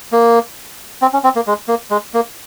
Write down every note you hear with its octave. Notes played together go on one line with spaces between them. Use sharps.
A#3
C4
C#4
C4
A#3
G#3
A#3
G#3
A#3